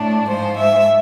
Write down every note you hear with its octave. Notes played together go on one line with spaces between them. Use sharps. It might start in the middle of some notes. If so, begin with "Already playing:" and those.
Already playing: A2 A3 D4
G#2 F3 G#3 C5
E5